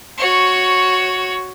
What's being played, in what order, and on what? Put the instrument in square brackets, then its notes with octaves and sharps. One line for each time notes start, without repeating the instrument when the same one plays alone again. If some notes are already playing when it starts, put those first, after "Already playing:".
[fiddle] F#4 C#5